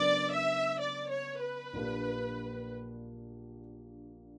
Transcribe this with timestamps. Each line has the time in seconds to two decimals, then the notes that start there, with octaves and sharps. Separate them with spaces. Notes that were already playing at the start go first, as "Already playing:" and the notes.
Already playing: C#3 F#3 B3 D4 A#4 D5
0.33 E5
0.80 D5
1.11 C#5
1.43 B4
1.73 A#1 A#2 A#3 D4 G4